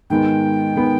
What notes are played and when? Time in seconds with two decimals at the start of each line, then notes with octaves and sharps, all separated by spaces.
0.10 G#2 D#3 G#3 B3 G5
0.76 D#3 G#3 B3